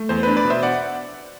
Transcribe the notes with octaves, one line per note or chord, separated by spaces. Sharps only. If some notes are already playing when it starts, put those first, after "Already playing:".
Already playing: A3
E2 C5
D4 B4
B4 D5
B2
C5 E5
D5 F#5